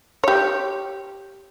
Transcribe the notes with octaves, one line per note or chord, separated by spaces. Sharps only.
G4 C#5